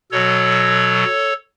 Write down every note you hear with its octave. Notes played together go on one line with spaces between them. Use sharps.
B2 F#3 A4 C#5